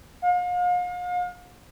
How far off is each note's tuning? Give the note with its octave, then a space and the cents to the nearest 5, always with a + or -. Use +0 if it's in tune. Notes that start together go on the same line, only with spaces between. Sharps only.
F5 +40